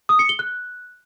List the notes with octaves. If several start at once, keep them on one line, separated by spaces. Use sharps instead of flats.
D#6
C#7
G7
F#6